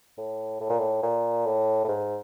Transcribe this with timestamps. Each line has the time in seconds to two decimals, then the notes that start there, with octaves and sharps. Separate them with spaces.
0.17 A2
0.60 A2
0.70 A#2
0.79 A2
1.02 A#2
1.46 A2
1.84 A2
1.88 G#2